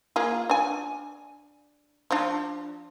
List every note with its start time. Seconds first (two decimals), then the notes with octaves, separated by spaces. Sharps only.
0.16 A#3 F4 G#4
0.50 D4 G#5
2.11 F3 D4